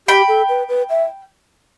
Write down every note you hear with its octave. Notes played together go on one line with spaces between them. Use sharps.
G4 G5 B5
A4
B4
B4
E5